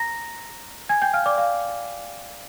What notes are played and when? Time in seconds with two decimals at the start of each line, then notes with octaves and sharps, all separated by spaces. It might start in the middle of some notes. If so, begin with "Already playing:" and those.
Already playing: A#5 A#6
0.89 G#5 G#6
1.02 G5 G6
1.14 F5 F6
1.26 D5 D6
1.38 F5